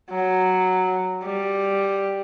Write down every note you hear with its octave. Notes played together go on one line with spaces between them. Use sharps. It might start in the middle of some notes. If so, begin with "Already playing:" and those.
F#3
G3